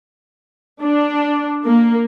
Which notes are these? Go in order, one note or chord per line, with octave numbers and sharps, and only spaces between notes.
D4
A#3